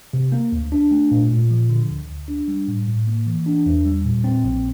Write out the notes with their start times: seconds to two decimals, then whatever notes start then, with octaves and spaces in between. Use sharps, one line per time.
0.13 C3
0.32 A#3
0.52 D2
0.72 D4
0.91 A3
1.11 A#2
1.31 A#2
1.51 F3
1.69 D3
1.90 D2
2.09 D2
2.28 D4
2.48 G3
2.68 A2
2.88 A2
3.07 A#3
3.27 E3
3.46 D4
3.66 E2
3.85 G3
4.05 A#2
4.24 C4
4.44 A#1